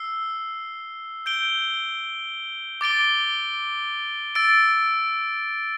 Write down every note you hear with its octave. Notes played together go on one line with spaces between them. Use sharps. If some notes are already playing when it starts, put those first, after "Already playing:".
Already playing: E6 C7 G7
G6 D7 G7
D6 A6 D7 G7
E6 A6 D7